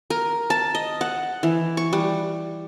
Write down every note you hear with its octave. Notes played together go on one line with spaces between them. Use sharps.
A#4
A5
D#5
F#5
E3
C#6
G3